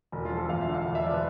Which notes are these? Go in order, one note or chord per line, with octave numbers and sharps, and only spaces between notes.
E1
F4
F3
A4
E2 F5
E5
D3
F5
E1
E5
F3 D5
B4